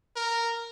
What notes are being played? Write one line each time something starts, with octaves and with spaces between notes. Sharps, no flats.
A#4